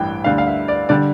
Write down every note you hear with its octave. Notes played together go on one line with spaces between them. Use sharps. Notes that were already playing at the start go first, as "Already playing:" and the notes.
Already playing: A1 G2 E3 G3 G5
D2 D3 G3 F5
F5
E5
D5
D3 G3 D5